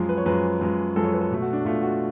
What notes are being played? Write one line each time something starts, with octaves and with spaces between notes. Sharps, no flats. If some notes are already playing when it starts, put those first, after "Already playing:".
Already playing: F#2 F3 G#3
B4
C#5
F#2 F3 G#3 B4
F#2 F3 G#3
F#2 F3 G#3 A4
C#5
B4
A4
B2 A3
F#4
D4
B2 A3 F4
F#4